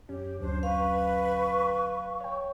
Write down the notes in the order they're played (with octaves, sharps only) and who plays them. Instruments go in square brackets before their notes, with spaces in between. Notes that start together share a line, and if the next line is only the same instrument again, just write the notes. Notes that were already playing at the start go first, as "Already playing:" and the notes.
[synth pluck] F#2 C#4 [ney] G4
[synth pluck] D2 F#3 [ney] D4 [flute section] C5
[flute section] B4 [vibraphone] F5 [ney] C#6
[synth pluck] C#5 G5